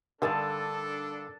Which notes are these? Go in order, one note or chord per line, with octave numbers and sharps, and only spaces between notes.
G2 D3 D4 A4 A5 D#6